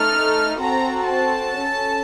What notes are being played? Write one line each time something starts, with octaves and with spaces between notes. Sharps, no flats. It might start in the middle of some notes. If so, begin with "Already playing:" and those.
Already playing: A3 D#4 A4 F6
C4 F#4 A4 A#5
A5
C#4 A4